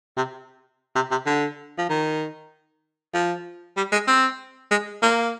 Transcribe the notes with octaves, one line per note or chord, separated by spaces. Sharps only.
C3
C3
C3
D3
F3
D#3
F3
G3
G#3
C4
G#3
A#3